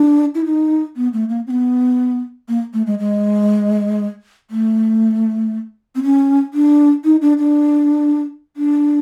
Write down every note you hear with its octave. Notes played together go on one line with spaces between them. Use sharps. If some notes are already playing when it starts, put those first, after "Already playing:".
Already playing: D4
E4
D#4
B3
A3
A#3
C4
B3
A#3
A3
G#3
G#3
A3
C4
C#4
D4
D#4
D4
D4
D4